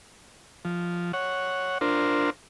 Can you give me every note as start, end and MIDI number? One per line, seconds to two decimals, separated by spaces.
0.65 1.12 53
1.13 1.78 73
1.13 1.78 78
1.81 2.30 62
1.81 2.30 65
1.81 2.30 70
1.81 2.30 72